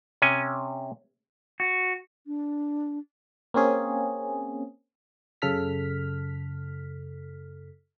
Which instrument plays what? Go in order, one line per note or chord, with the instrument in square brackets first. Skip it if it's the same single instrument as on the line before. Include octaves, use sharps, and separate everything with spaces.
[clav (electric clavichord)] C3 C#4 G#5
[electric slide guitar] F#4
[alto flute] D4
[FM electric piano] A#3 C4 C#4 G#4
F#2 C#3 A4 F6 B6